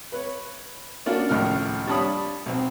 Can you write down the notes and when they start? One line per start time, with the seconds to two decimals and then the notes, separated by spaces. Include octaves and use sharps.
0.12 B4 C#5
1.06 A#3 C#4 D4 F4 F#4
1.29 G#1 C#2 A2 F3 F6
1.87 G3 D4 C#5 A5 B5 D#6
2.46 B1 C4